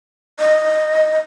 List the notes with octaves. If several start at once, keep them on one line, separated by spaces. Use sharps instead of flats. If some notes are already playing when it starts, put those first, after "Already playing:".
D#5